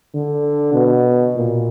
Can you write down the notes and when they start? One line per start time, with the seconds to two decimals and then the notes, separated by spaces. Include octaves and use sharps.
0.14 D3
0.73 B2
1.35 A#2